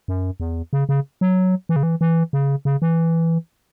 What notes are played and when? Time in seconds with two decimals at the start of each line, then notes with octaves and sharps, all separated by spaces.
0.08 F#2
0.40 E2
0.73 C#3
0.89 C#3
1.21 F#3
1.69 E3
1.76 C#3
1.83 E3
2.01 E3
2.33 C#3
2.65 C#3
2.82 E3